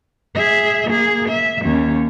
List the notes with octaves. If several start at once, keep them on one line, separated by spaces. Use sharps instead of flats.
G#4 E5
A#3 G#4
E5
D#2 C#4